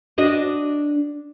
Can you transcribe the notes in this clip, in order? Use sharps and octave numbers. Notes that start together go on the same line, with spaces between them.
D4 F#4 D#5